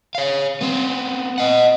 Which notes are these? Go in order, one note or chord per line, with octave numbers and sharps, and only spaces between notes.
C#5 F5
B3 C4
D#5 F#5